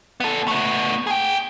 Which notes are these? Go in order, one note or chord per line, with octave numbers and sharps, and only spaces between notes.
B3 A4
A3 B3
G#4 G5